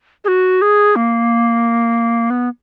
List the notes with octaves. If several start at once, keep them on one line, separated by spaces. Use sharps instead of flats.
G#4
F#4
G#4
A#3
B3